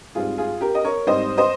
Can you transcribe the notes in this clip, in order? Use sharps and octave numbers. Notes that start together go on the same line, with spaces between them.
G#2 G3 C4 F4 G#4
F4 G#4
G4 A#4
D#5
A#4 C#5
G#2 G3 C4 C5 D#5
C5 D#5